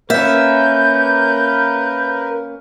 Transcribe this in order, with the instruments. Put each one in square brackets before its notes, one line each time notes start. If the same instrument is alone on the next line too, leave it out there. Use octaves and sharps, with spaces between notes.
[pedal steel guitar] A#3 C#4 [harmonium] A#4 B4 [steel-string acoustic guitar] E5 [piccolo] G6